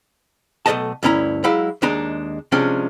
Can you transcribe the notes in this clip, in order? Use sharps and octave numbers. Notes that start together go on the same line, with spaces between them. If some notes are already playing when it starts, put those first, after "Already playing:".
B1 B2 A3 D#5 A5
D2 G2 C#4 E4 A#5
F#3 G#3 E4 F5
D#2 G#3 D4 D#4 A#5
C3 F3 G#3 C#4 D4